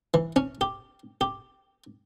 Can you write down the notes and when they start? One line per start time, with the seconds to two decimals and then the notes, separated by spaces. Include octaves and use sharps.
0.14 E3
0.36 C#4
0.61 G4
1.21 G4